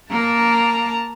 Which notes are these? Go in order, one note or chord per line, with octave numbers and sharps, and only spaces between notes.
A#3 A5 A#5